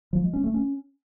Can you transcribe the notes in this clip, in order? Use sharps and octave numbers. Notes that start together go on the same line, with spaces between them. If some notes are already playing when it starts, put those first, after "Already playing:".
F3
G#3
C#4
A3
C#4